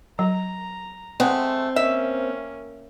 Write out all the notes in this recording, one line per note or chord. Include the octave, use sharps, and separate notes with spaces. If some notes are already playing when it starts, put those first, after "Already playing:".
F#3 A#5
G#3 A3 C4 F#5
A#3 C#4 D#5 E5